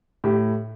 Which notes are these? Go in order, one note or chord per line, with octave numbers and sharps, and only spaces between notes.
A2 G4